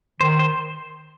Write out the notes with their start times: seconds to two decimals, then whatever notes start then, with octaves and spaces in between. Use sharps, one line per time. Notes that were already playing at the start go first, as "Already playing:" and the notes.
0.20 D#3 C5
0.39 C5